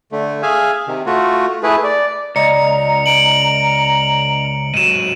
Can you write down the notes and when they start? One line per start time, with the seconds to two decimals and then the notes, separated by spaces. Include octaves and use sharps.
0.12 D3 A3
0.43 G#4 E5 F5 G#5
0.87 C3 D#3
1.06 A3 F4 F#4
1.63 A3 E4 G#4 B4
1.84 D5
2.36 C#2 D5 D#5 A#5 C#7
3.06 D7 F#7
4.74 G#2 F#3 D#7 E7